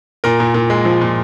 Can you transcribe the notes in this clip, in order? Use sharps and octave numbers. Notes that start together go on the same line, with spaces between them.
A#2 A#4
A#2
A#2
G#3
F3
A#2